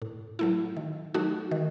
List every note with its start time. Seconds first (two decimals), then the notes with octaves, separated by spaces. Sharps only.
0.02 A2
0.39 F#3 A3 E4
0.77 D#3
1.14 F#3 A3 D#4 F#4
1.51 D#3